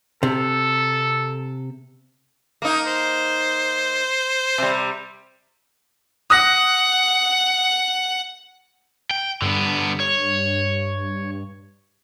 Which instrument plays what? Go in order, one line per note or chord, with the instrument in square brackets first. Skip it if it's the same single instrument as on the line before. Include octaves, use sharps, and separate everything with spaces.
[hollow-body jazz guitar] C3 [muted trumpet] A4
[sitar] A#3 D#4
[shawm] C5
[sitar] C3 G3
[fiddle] F#5 [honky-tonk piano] D#6 F#6 A#6
[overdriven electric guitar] G5
[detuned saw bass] G2 [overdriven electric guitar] D3 B3
[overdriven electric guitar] C#5